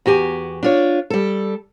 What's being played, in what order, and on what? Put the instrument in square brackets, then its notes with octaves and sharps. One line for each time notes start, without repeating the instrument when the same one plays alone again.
[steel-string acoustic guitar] E2 F#4 G4 G#5
D4 F4 C#5
G3 A4